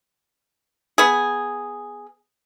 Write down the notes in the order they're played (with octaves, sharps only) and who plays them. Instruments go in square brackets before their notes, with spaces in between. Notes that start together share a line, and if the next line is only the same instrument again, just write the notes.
[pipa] B3 G#4